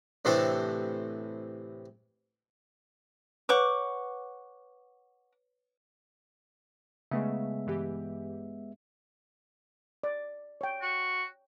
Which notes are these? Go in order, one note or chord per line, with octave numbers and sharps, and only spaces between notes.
A2 C3 E3 C4 D4 A4
B4 C#5 F#5 C#6 D6
C#3 G#3 A3 B3 E5
G2 E3 G4
D5
C#5 G5
F#4